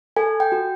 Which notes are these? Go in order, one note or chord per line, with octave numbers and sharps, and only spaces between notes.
A4 G#5
G5
F#4